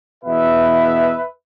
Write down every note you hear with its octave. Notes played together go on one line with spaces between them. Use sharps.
E2 B2 B3 B4 E5